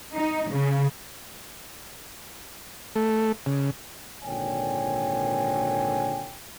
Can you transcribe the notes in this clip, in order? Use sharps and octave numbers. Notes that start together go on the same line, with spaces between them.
D#4
C#3
A3
C#3
G#1 A#2 D3 C#5 G5 G#5